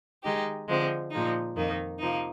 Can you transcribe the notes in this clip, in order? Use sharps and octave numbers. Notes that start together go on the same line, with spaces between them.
D#3 G#3 D#4 G4
D3 F3 G#3 C4
A#2 F3 G#3 D#4
F2 D#3 A#3 D#4
C3 F3 A#3 D#4